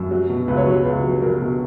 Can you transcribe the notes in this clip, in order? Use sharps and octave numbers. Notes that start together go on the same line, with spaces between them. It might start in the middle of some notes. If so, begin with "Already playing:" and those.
Already playing: F#2
F#3
B2
C#2 B4
C#5
F#3 B4
C#2
F#3
F#3 A#4
B2